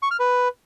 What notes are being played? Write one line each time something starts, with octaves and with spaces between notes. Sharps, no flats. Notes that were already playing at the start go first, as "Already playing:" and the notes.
C#6
F6
B4